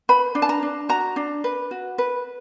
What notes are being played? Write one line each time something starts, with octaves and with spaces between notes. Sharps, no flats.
B4 B5
D4
A5
A#5
D4
F#4 A#5
D4
B4
F#4
B4